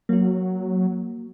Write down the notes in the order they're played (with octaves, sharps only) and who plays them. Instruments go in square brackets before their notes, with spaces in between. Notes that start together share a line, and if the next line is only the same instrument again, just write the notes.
[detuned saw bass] F#3 [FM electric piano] A#3 F#4